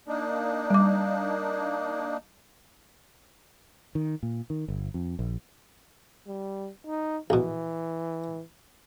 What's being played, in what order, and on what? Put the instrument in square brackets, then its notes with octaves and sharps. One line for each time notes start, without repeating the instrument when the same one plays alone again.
[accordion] A#3 D4 D#4
[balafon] G3 D6
[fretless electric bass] D#3
A#2
D#3
G1
F2
A#1
[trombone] G3
D#4
[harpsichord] A#1 B2 [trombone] E3